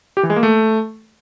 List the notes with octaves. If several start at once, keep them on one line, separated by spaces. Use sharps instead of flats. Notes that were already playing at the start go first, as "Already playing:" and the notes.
G4
E3
G#3
A#3
A3